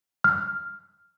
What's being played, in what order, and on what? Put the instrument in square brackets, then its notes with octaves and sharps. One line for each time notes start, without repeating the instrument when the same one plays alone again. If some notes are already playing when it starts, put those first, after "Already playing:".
[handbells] F6